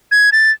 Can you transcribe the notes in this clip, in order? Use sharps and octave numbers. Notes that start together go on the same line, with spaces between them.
G#6
A6